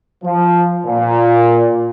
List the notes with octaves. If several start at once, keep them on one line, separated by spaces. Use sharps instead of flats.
F3
A#2